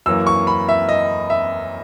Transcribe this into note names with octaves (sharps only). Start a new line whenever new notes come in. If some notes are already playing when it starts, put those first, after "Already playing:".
F#2 E3 A#3 E6
C#6
B5
E5
D#5
E5